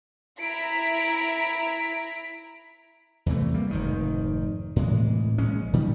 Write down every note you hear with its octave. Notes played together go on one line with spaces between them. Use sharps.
E4 A#5 B6 D7
E2 C3 E3 A3
G3 A#3
F1 G#2 D#3
A2 C3 E3 G#3
A#1 G#3 C#4
A#2 D#3 G3